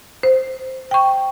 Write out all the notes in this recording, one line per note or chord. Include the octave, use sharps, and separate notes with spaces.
C5
G5 C#6